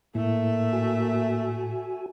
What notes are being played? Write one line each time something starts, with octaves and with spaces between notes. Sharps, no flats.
A2 A3 A#3 E5
F#4 G#5